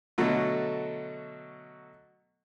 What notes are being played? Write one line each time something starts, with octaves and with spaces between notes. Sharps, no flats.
B2 D3 F#3 A3